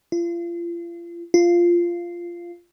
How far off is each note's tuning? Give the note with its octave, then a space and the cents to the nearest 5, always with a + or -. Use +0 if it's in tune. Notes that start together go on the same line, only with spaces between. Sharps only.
F4 -35
F4 -10